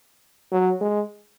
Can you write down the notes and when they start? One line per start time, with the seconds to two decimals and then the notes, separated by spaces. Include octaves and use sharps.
0.52 F#3
0.81 G#3